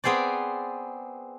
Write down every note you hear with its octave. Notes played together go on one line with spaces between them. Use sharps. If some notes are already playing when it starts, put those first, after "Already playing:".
B3 C4 G#4 C5 D5